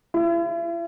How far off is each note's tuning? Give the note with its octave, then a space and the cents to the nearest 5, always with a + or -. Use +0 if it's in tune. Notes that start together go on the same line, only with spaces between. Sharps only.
E4 +40